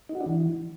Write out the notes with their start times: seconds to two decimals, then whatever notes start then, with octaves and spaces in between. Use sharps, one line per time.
0.09 D#4
0.15 F#4
0.21 D4
0.26 E3